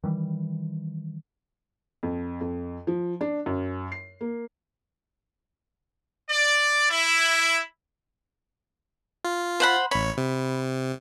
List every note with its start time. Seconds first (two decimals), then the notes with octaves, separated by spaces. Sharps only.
0.04 D#3 E3 G3
2.03 F2
2.41 F2
2.87 F3
3.21 D4
3.46 F#2
3.92 C7
4.21 A#3
6.29 D5
6.89 E4
9.25 F4
9.60 C5 F#5 B5
9.91 A1 C#5 B5
10.17 C3